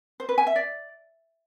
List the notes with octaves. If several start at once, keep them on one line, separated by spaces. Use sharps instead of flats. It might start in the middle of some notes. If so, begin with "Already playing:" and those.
C5
B4
G#5
E5
D5